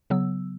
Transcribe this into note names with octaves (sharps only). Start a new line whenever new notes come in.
C#3 F#3 B3 E6